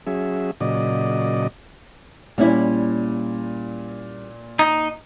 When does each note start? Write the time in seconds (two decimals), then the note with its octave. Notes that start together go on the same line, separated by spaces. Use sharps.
0.07 F#3 C#4 G#4 E5
0.61 A#2 C#3 F#3 D5 D#5
2.38 A#2 G3 C#4 E4
4.59 D#4